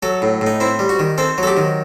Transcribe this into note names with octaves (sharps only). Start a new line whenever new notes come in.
F#3 A4
A2
A2
D#4
C4 E4
G3
F#4
D#3
C4 A4
F#3 A4
G4
D#3